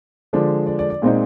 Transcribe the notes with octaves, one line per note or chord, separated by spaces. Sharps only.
D3 F3 G#3 D4
D5
D5
D5
A#2 G#3 C4 D#4